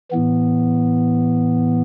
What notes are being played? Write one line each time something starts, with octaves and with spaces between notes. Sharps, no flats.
A2 E3 B3